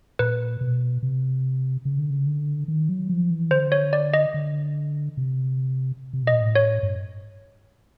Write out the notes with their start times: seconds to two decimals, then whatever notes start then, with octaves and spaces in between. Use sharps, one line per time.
0.19 A#2 B4
0.61 B2
1.03 C3
1.85 C#3
1.98 D3
2.10 C#3
2.26 D3
2.68 D#3
2.89 F#3
3.09 F3
3.31 E3
3.51 D3 C5
3.72 C#5
3.93 D5
4.14 D#5
4.34 D3
5.17 C3
6.13 C3
6.23 B2
6.27 A#2 D#5
6.41 A2
6.55 C#5
6.83 G2